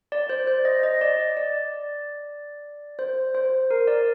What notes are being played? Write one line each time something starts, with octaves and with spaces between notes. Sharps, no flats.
D5
C5
C5
D#5
D#5
D5
D5
C5
C5
A#4
D5